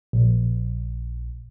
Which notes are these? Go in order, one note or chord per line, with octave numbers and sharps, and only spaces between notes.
A#1